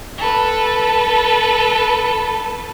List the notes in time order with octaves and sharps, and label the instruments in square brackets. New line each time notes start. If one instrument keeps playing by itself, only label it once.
[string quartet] A4 B4